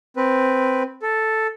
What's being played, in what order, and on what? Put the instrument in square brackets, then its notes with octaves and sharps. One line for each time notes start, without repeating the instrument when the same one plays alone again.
[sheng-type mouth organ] C4 B4
A4